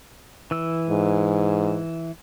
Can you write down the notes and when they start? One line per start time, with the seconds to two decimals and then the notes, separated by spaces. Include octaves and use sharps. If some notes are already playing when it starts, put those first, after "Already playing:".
0.51 E3 E6
0.90 G#2